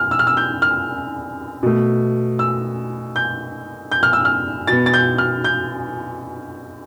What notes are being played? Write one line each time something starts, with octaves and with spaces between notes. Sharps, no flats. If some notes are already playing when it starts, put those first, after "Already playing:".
Already playing: F6
E6
F6
E6
G6
F6
B2 A3
E6
G6
G6
F6
E6
F6
B2 B3 A6
A6
G6
F6
G6